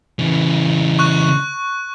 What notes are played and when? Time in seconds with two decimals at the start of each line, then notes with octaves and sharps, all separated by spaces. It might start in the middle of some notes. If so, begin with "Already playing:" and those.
0.19 C#3 E3
0.99 C#6 F#6